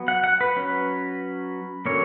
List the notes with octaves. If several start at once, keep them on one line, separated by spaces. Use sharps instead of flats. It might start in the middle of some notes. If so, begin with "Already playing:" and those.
Already playing: F#3 B3
F#5
F#5
B4
F#3 C#4
D3 F#3 A#3 C#4 C#5